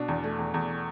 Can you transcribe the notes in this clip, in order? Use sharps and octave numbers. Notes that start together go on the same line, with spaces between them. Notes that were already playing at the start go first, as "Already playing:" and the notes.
Already playing: B2 D4
E2
A3
E2
E2